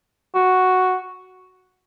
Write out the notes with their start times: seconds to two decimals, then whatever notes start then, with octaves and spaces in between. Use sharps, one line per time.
0.35 F#4